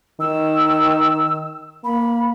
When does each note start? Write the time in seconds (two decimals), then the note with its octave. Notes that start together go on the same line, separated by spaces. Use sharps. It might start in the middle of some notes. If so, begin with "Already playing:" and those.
0.20 D#3 E6
1.84 A#3 B5